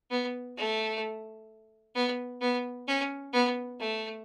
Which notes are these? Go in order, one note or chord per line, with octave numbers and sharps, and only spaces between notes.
B3
A3
B3
B3
C#4
B3
A3